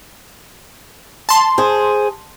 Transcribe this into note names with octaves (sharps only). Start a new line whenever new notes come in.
A5 C6
G#4 C5